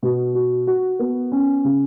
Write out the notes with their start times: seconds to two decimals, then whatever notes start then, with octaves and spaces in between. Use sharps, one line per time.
0.02 B2
0.35 F#4
0.67 F#4
0.99 B3
1.32 C#4
1.64 C#3